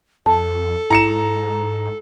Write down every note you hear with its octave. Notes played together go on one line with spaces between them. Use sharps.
F2 A4 A5
G#2 E4 A#5 C#7 E7